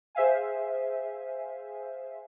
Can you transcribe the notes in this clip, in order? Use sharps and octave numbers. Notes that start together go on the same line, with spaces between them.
G#4 C5 E5 F5 G#5